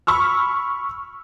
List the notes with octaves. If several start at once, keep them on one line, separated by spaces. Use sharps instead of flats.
B5 C#6 E6 F6